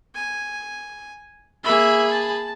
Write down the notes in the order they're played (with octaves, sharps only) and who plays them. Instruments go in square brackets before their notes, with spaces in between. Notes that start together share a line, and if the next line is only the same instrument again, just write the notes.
[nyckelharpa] G#5
[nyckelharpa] A#3 E5 [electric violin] G#4 B5
[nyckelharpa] A5